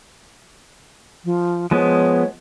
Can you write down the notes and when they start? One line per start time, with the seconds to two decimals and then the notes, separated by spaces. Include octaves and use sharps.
1.25 F3
1.71 F3 G#3 B3 C#5